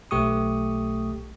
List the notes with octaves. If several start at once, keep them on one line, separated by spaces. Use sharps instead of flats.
B1 A3 G4 C#6 D#6